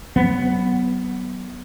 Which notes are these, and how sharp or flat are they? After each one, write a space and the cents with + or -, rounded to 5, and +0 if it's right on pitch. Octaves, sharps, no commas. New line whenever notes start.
F#3 +25 B3 +0